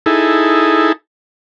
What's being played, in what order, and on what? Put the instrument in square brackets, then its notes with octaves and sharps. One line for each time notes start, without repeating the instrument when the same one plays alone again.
[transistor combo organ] D#4 E4 G#4 A4